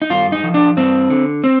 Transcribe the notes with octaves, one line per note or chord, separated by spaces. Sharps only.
D#4
G2 F4
D#4
F3
D4
G2 C4
D3
C4